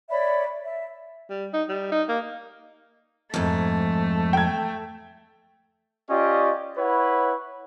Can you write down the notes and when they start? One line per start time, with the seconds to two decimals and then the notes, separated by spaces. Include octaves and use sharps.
0.10 C#5 D5 E5 B5
0.64 E5
1.30 G3
1.54 D#4
1.69 G3
1.92 D#4
2.09 A#3
3.34 F2 G#2 A3
4.33 G5 G#6
6.10 C#4 F4 G4 D5 D#5
6.77 E4 B4 C#5 F#5 B5